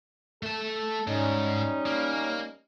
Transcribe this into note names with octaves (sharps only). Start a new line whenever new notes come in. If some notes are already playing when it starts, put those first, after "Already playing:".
A3 A4 A5
G#2 G3 C#4 D#4
A#3